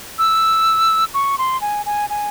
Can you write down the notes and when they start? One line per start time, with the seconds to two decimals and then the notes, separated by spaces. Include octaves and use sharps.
0.19 E6
1.14 C#6
1.38 C6
1.61 G#5
1.86 G#5
2.10 G#5